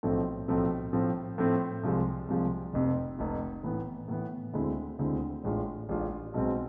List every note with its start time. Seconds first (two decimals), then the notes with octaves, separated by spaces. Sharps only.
0.03 B1 A2 F3 A3 C4
0.48 B1 A2 F3 A3 C4
0.93 A2 F3 A3 C4
1.38 A2 F3 A3 C4
1.83 C2 C3 F3 G#3
2.28 C2 C3 F3 G#3
2.73 F1 F2 C3
3.19 F1 F2 C3
3.63 A2 E3 B3
4.08 A2 E3 B3
4.53 D2 D3 G#3 C4 E4
4.99 D2 D3 G#3 C4 E4
5.43 A1 A2 G#3 D4 F4
5.89 A1 A2 G#3 D4 F4
6.34 B1 B2 G#3 C4